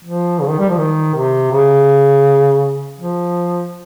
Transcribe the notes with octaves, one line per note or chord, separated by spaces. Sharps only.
F3
C#3
D#3
G3
F3
D#3
C3
C#3
F3